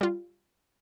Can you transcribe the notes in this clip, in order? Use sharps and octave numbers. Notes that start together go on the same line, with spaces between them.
G3 F4